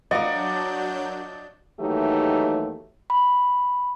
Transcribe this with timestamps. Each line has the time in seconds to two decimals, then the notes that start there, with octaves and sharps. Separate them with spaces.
0.11 F#3 D4 F#4 A#4 D5 D#5 F5 G6
1.80 D#2 E3 F#3 A3 D#4 G4
3.10 B5